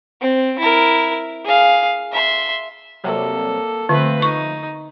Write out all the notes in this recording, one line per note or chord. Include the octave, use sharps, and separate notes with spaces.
C4
E4 A#4
G#4 F5
E5 C6
C3 F#3 G3 A#3 A4
D3 F3 A3 C4 B4
D#4 C#6